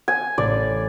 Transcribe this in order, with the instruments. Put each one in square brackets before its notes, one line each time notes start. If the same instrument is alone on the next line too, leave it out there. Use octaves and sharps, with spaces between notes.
[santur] G#5
[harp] A1 [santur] D5